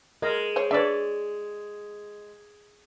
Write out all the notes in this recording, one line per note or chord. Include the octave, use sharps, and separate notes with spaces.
G#3 A#4 D#5
C5 C#5
D4 B4 C#5 D5 E5